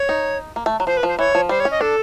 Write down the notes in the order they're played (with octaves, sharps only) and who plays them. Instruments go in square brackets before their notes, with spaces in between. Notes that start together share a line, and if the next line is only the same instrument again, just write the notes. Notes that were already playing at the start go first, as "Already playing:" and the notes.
Already playing: [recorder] C#5
[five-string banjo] D#4
A#3
A3
F#3
[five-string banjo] F3 [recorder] C5
[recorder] B4
[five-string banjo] F3 [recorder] C5
[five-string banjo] E3 [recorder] C#5
[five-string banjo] F3
[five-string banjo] G3 [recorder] C5
[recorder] C#5
[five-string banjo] C#4
[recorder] D#5
[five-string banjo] D4 [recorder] A4